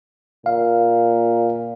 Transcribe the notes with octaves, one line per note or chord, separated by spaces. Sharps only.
A#2 F5